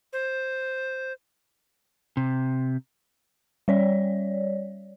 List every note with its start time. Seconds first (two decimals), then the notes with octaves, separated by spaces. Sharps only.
0.13 C5
2.17 C3
3.68 G3 C#5 D5